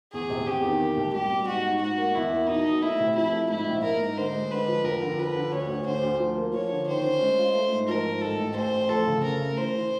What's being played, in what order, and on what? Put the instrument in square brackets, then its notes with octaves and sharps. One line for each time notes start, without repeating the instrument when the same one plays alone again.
[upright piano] E2 [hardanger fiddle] G#4
[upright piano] C3
[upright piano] E2 [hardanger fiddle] G4
[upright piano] D#3
A#3
C2
[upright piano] G3 [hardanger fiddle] G4
[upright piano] B2
[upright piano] G#2 [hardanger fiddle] F#4
[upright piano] D#4
[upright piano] G#2 [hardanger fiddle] F#4
[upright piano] A#3
[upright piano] E2 [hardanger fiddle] E4
[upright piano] A#3
[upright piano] B2 [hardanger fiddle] D#4
[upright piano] F#3
[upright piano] A3 [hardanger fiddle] E4
[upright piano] C3
[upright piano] F3 [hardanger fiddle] E4
[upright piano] A3
[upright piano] G#2 [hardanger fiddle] E4
[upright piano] A#1
[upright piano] A#3 [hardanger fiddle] A#4
[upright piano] G#2
[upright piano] D3 [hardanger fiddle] C5
[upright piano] G#3
[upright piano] D3 [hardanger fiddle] B4
[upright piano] F3
[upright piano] F2 [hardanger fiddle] A#4
[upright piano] D3
[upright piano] F3 [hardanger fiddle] B4
[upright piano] D3
[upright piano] D2 [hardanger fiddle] C#5
[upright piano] D2
[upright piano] D3 [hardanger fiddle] C5
[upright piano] D2
F3
A#3
[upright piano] F3 [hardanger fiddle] C#5
[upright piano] D3
[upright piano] D#3 [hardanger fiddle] C5
[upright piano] C#4
G#3
F4
A3
G#2
[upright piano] F3 [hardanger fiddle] A#4
[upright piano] G#2
[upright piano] A1 [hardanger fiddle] A4
[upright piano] A2
[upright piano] A1 [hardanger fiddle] C5
[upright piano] A2
[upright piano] F2 [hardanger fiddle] A4
[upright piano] C#3
[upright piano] C#3 [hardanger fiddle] A#4
[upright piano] A3
[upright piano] E3 [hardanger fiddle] C5
[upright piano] E3